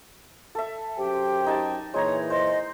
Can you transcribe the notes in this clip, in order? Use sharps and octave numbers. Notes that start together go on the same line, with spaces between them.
A4 E5
F#2 G4 C5 G5
D#4 G#5 A5
A#2 E3 G#3 D#4 C#5 A#5
C5 D#5